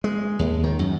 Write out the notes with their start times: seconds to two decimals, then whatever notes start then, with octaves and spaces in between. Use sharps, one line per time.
0.04 G#3
0.39 D#2
0.64 D#3
0.79 F#2